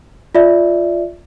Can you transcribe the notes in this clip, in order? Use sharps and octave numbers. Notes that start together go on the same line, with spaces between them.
F4 D5 E5